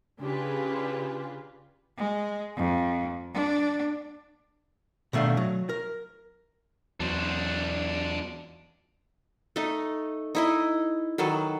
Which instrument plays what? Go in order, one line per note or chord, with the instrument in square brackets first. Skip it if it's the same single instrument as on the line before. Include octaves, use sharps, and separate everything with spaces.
[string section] C#3 D4 F4 G4 G#4 B4
[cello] G#3
F2
D4
[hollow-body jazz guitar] B2 D#3 A3 D4 F5
F#3
A#4
[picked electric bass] E2 F#3 [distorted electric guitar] D4 C5
[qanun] A3 D#4
D#4 E4 D#5
D#3 F#3 A4 B4